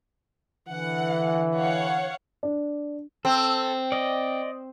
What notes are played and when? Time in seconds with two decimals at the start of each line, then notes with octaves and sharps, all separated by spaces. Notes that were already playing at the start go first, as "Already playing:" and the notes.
0.69 D3 E3 F#5
1.56 C#5 F5 F#5
2.43 D4
3.25 C4 A4
3.92 D5 D#5